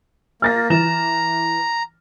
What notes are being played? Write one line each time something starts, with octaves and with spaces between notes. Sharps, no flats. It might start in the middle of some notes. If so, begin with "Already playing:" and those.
A#3 F6 A6 A#6
E3 A#5 E7